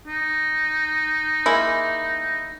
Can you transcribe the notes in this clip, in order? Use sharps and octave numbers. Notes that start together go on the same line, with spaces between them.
D#4
G#3 A#3 E4